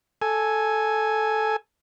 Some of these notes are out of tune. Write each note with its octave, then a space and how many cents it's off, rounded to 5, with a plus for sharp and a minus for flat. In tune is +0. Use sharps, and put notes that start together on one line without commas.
A4 -10 G#5 +0